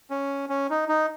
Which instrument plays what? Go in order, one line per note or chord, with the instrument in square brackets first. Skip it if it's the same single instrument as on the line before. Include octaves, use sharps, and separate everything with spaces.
[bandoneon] C#4
C#4
D#4
D#4